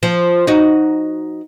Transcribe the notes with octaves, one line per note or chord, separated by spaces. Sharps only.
F3
D#4 F#4